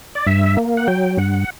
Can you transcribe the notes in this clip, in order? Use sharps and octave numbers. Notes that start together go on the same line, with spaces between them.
D5
G2 E5
A#3
F#5
F#3 G5
G2 F#5